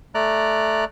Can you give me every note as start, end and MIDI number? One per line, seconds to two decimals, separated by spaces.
0.14 0.85 57
0.14 0.85 74
0.14 0.85 82
0.14 0.85 90